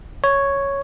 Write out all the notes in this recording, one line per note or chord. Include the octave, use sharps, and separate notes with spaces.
C#5